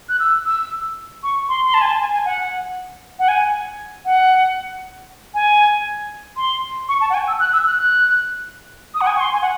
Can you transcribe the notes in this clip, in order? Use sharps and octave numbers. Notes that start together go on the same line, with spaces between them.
F#6
E6
E6
C#6
C6
C6
A5
G#5
A5
G#5
G#5
F#5
F#5
G#5
F#5
G#5
C6
C#6
A5
F#5
G#5
E6
F#6
E6
F#6
F#6
D#6
F#5
G#5
C#6
C6
G#5
F#5